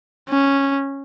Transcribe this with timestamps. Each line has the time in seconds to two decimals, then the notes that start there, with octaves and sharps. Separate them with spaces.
0.29 C#4